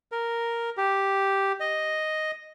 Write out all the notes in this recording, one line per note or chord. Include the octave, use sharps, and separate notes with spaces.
A#4
G4
D#5